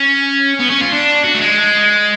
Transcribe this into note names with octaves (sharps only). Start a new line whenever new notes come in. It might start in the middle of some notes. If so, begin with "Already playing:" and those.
Already playing: C#4
B3
C#4
F4
D4
F#4
A3
G#3